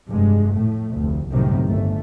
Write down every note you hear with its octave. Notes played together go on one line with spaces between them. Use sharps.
F1 G2 G#3
A2 A3
F1 D2
G1 C2 F#2 A2 C3 D#3
G1 A3